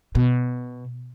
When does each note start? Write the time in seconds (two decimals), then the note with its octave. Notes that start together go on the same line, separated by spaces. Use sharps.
0.15 B2